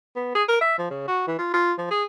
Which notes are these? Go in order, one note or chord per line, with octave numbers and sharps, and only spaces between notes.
B3
G#4
A#4
E5
F3
C#3
F#4
E3
F4
F4
F3
G#4